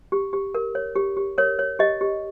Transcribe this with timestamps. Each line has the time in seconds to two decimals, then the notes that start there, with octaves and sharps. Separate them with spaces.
0.12 G4
0.33 G4
0.55 A#4
0.75 C#5
0.96 G4
1.17 G4
1.38 A#4 C#5
1.59 C#5
1.79 G4 D#5
2.01 G4